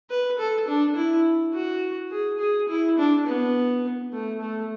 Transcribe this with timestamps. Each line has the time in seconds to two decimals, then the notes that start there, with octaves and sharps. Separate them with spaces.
0.10 B4
0.38 A4
0.68 D4
0.96 E4
1.54 F#4
2.12 G#4
2.40 G#4
2.68 E4
2.98 D4
3.27 B3
4.13 A3
4.41 A3